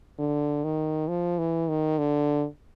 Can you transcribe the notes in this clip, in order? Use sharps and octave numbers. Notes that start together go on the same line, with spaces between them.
D3
D#3
F3
E3
D#3
D3